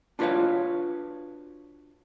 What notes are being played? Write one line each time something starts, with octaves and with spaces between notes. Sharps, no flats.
D4 F4 F#4 B4 C#5 F5